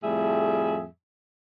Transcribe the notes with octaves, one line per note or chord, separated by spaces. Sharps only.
F2 A2 G3 A3 G#4 E5